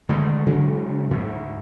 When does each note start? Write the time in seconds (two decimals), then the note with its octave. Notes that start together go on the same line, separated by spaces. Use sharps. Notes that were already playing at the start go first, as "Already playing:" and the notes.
0.09 D3 D#3 G#3 A3
0.46 C#3 F#3 G#3 D4
1.11 D2 G#2